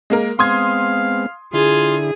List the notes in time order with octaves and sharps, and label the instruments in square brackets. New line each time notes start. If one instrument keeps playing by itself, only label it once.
[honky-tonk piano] G#3 A#3 A#4
[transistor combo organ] G#3 B3 C4 [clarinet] F5 [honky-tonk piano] C6 D#6 G#6
[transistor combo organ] D3 E4 [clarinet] F4 [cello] G#4